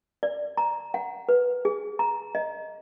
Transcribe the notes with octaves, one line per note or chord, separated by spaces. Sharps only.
D5
A#5
F#5
B4
G#4
A#5
D#5